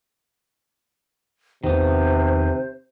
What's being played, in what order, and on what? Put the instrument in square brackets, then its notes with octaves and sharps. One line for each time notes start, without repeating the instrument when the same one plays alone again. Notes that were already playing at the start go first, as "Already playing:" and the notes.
[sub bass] E2 [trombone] C3 [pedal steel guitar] D#3 B3 [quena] C5